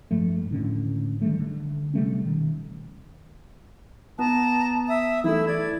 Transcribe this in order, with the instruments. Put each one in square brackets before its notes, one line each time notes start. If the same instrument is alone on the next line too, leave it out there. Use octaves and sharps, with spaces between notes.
[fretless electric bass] G2 F3 G#3 A3
D#2 A2 D3 C#4
D#3 G3 A3
D3
C3 G3 A3 C#4
B2 D#3
[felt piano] B3 [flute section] A5 A#5
[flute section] E5 D#6
[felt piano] E3 A3 [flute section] E4 E6
[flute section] D5 G#6